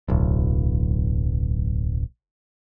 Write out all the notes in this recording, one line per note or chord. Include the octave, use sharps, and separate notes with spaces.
D1 B1